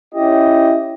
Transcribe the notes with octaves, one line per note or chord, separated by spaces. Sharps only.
C#4 E4 G4 D#5